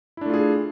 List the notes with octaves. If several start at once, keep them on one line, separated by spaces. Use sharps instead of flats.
A3 D4 E4 F4 G#4